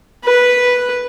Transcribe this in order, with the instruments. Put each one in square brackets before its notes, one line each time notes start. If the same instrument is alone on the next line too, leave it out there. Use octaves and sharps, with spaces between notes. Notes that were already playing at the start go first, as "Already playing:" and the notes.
[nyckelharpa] B4